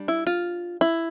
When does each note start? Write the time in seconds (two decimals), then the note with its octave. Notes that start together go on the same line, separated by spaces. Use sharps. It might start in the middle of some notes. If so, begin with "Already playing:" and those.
Already playing: G3 D4
0.08 E4
0.27 F4
0.81 E4